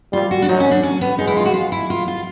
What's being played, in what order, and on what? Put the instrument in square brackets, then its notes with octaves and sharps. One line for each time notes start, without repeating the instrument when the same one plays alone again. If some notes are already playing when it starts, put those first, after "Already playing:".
[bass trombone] G3 [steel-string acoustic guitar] F4
[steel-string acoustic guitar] F#4
D4
[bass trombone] F#3 [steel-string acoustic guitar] D#4
[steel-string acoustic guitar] C#4
D4
C#4
B3
[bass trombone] G#3 [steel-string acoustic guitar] D#4
[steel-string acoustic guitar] E4
F4
F#4
F4
E4
F4
F4